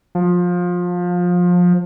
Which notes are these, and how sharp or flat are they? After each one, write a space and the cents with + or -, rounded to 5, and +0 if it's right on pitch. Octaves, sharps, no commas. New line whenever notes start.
F3 +25